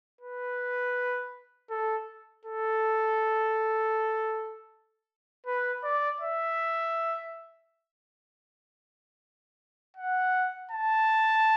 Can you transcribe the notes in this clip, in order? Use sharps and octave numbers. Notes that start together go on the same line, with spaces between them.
B4
A4
A4
B4
D5
E5
F#5
A5